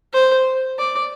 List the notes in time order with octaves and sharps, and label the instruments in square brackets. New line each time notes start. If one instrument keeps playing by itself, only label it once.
[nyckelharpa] C5
D5